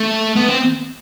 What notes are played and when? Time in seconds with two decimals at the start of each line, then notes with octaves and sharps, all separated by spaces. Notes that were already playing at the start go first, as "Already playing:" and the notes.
Already playing: A3
0.36 B3
0.49 C4